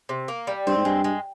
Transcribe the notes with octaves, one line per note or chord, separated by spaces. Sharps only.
C3
A#3
G3
G2 C4
G#2
G2 G#3
G#3